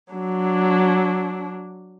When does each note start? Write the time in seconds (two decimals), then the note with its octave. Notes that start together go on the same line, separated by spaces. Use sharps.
0.13 F#3 D4